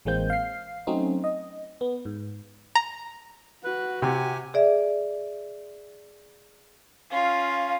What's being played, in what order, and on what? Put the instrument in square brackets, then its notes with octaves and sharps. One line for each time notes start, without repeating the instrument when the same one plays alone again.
[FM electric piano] A1 E3 G#3 A#3 C4 G6
F5 C7
F#3 A3 C4 C#4 D#4
D#5
B3
G#2
[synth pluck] A#5
[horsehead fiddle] F#4 [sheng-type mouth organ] B4
[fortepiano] C3 [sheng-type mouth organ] G4 G#5
[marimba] G#4 D5 E5
[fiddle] C#4 F4 [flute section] F5